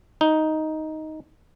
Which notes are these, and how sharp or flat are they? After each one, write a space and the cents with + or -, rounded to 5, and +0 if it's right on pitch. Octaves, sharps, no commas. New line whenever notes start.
D#4 +5